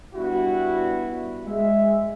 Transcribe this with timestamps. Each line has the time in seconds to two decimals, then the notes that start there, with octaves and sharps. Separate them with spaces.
0.15 G3 B3 D4 E4 F#4
1.46 G#3 E5